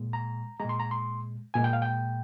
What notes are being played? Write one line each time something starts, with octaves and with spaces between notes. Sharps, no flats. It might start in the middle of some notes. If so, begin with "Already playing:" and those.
Already playing: A#2 G#3
A#5
A#2 G#3 A#5
C6
A#5
C6
A#2 G#3 G#5
G5
F5
G5